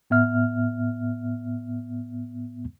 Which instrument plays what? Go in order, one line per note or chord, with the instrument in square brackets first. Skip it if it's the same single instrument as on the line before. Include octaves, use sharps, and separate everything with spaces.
[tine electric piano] A2 B3 E5 F6